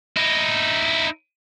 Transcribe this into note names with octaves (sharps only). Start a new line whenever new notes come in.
D#4 E4